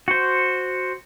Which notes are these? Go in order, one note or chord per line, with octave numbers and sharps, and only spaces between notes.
F#4 C5